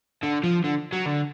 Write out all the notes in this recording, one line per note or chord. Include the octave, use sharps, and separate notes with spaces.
D3
F3
D3
F#3
D3